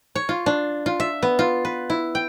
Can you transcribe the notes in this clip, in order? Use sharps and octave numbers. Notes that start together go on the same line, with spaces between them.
C#5
F4
D4
F4
E5
B3
F4
B4
E4
G5